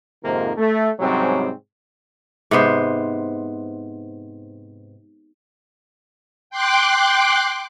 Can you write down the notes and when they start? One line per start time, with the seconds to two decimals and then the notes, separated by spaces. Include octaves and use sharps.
0.23 F2 G#2 C3 D#3 F3 A#3
0.57 A3
1.00 G#2 C3 F#3 G3 C4 C#4
2.51 G#2 C3 B3 C5
6.50 G5 C6 D6 F#6